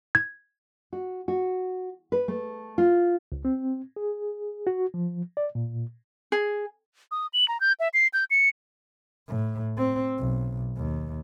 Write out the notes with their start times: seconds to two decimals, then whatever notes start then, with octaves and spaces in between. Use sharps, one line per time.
0.15 G#6
0.93 F#4
1.28 F#4
2.12 B4
2.28 A3
2.78 F4
3.32 C#2
3.45 C4
3.96 G#4
4.67 F#4
4.94 F3
5.37 D5
5.55 A#2
6.32 G#4
7.11 D#6
7.33 F#7
7.48 A#5
7.61 G6
7.80 E5
7.94 C7
8.13 G6
8.31 C#7
9.27 A2
9.77 C4
10.18 B1
10.77 D#2